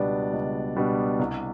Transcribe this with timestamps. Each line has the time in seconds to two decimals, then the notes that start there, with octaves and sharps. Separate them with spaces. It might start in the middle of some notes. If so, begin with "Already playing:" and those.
Already playing: C#2 B2 G3 B3 D4 D5
0.33 C#2
0.76 B2 G3 B3 D4
1.19 C2